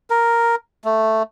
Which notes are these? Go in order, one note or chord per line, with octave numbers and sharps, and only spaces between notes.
A#4
A3